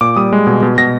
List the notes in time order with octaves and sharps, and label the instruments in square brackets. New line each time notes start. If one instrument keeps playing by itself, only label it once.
[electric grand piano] A#2 D6
G3 D#6
G#3
B2
B2
B2 A#6